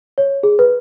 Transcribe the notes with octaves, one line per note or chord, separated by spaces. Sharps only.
C#5
G#4
B4